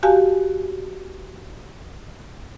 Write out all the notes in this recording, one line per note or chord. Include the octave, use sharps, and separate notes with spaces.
F#4 G4 F5 G#5 A5